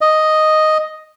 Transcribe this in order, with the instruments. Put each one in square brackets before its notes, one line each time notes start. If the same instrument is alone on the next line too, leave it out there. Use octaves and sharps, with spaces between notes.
[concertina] D#5